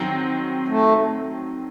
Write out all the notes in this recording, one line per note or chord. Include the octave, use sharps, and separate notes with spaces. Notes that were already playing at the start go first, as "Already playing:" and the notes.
Already playing: D#3 F#3 C4
A3